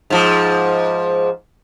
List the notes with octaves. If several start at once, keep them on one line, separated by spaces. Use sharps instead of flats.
G#2 F3